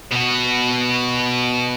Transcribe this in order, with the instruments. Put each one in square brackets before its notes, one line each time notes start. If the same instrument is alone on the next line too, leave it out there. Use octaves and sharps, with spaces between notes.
[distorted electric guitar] B2 F#4